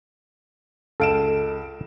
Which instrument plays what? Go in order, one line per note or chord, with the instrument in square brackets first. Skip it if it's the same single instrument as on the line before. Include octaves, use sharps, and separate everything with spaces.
[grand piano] C#2 D7 E7 [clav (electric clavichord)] A4 F5